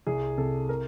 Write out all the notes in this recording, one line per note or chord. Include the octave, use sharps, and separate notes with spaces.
C2 G#4
C3 A4
A#4